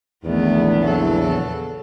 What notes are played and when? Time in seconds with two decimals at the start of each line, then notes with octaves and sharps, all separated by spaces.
0.24 A#1 E2 D#3 A3 B3
0.85 C#3 F#3 A4